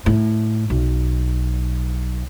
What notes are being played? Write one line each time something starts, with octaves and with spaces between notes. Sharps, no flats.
A2
B1